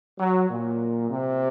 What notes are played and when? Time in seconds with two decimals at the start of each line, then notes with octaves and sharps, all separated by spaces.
0.20 F#3
0.50 A#2
1.09 C3